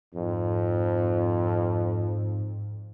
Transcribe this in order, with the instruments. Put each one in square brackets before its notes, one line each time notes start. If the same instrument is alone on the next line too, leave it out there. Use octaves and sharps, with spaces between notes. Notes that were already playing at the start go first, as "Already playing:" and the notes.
[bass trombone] F2 [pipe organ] G#2